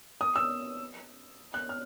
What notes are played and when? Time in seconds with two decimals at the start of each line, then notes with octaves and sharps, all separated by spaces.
0.21 D#6
0.36 E6
1.54 F#6
1.69 F6